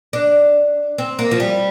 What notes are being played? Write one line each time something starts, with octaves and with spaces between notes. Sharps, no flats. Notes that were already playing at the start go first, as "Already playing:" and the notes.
D4
C4
A#3
F3
G3